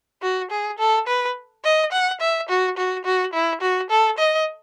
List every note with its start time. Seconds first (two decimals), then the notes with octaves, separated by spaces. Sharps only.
0.22 F#4
0.51 G#4
0.79 A4
1.07 B4
1.64 D#5
1.92 F#5
2.21 E5
2.49 F#4
2.77 F#4
3.05 F#4
3.33 E4
3.61 F#4
3.90 A4
4.18 D#5